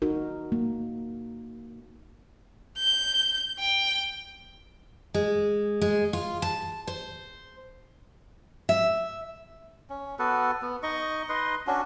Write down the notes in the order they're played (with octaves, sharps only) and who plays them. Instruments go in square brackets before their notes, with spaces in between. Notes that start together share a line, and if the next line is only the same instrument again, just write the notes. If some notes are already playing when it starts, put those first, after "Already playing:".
[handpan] D#4 F#4 A#4
A#3
[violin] G6
G5
[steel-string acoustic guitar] G#3
G#3
F4
A5
C5
E5
[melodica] C#4
B3 F#4 A4 B4
B3
D#4 D#5 C#6
D#4 B4 D#5 C6
C#4 D4 F#4